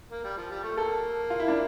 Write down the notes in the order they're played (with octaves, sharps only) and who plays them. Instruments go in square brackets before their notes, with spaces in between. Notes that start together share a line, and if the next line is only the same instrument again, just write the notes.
[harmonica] A#3
G3
F3
G3
A3
[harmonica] A#3 [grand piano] A4
[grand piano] F4
E4
D4